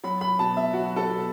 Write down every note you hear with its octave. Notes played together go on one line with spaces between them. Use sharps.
F#3 B5
B5
B2 A5
E5
F#3 F#4
A4
B2